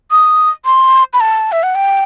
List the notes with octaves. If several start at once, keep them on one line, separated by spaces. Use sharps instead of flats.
D#6
C6
B5
A5
E5
F#5
G5